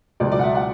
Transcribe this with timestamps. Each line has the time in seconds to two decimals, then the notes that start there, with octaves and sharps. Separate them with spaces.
0.20 C#2 B2 F#3 D5
0.32 D5
0.39 F#5
0.44 E5
0.55 F#5